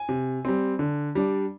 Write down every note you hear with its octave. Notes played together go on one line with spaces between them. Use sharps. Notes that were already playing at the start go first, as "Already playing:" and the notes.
Already playing: G#5
C3
G3 C4
D3
G3 D4